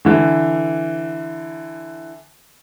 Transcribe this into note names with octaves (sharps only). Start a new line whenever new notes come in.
D3 E3